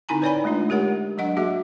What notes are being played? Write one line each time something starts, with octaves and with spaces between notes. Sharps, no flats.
D3 C4 D#4 E4 G#5 A#5
B4 C#5 D5 G5 G#5 B5
G#3 A3 D4 F4
G#3 G4 A#4 C#5 F#5
F#3 D4 D#5 F#5
A#3 F#4 G#4 D#5 E5